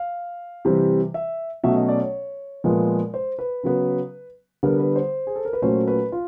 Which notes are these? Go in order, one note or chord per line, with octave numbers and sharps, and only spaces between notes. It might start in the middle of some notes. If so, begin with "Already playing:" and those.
Already playing: F5
C3 E3 G3 C4
E5
B2 F#3 A3 C#4 E5
D#5
D5
C#5
A#2 F3 G#3 B3
C5
B4
C#3 F#3 B3
D3 G3 B3 A#4
B4
C5
G#4
A4
A#4
B4
A#2 F#3 A3 C#4 C5
B4
F4